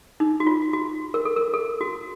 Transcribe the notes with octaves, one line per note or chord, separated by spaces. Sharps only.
D#4
F#4
F4
F#4
A#4
A4
A#4
A4
F#4